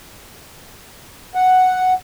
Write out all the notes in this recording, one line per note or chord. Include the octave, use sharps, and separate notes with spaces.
F#5